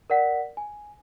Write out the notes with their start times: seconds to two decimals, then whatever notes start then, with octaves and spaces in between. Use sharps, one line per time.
0.10 A#4 D5 F#5 B6
0.57 G#5